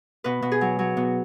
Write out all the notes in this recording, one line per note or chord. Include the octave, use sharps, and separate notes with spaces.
B2 B4
B2
G#4
F#3
F#3
B2